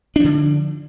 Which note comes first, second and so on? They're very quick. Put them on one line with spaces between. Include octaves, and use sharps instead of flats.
D4 F3 D3